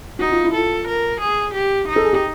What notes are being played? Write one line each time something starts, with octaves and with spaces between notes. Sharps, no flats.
D#4 F#4
F4
E4
F4 A4
A#4
G#4
G4
D#4
A4
G#4
G4